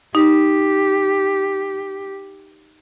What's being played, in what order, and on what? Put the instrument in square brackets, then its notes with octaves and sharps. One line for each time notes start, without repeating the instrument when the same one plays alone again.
[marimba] D#4 [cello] G4